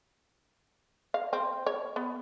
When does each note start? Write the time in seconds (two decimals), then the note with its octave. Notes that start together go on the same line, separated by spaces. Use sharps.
1.14 F5
1.33 C4
1.66 C#5
1.96 B3